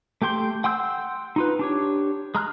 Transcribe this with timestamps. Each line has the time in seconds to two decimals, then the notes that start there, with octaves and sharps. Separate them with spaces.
0.22 A3 G4 G5 C6 G6
0.64 F#5 G5 C6 E6 G6
1.36 D#4 F4 B4
1.59 D4 G4 C#5
2.35 G#3 A#5 F6 F#6